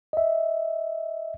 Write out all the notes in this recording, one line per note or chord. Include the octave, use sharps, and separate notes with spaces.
D#5 E5